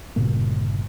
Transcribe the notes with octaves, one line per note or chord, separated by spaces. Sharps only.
G1 A#2 C#3 A#3